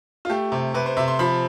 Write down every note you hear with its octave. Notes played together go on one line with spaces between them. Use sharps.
F4
A3 G4
C3
C3 B4
C5
C3 E5
C6
F3 B5